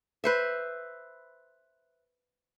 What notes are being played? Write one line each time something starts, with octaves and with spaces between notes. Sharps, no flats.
B4 C5 E5